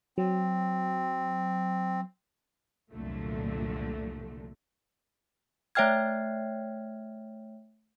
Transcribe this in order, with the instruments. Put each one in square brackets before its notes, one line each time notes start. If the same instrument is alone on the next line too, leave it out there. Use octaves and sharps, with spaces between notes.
[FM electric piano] F#3 [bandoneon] C4
[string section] C2 F2 A#2 D3 F#3 A3
[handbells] A3 C#5 E5 G5 F6 G#6